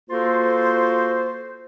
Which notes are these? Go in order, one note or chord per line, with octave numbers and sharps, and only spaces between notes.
A#3 F4 F#4 A4 C5